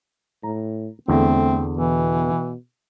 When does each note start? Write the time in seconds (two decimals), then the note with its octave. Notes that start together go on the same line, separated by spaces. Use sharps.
0.43 A2 A#5
1.08 E2 D3 A3 C4
1.77 B2 E3